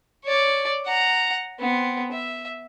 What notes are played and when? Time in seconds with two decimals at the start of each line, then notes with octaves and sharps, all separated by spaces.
0.24 C#5 D5
0.86 F#5 A#5
1.60 B3 C4
2.12 E5